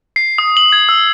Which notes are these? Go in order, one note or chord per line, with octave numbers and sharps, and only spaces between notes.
C7
D#6
F#7
G#6
E6